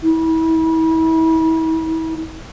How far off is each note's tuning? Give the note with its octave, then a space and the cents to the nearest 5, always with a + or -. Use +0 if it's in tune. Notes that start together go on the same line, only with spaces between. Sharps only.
E4 -35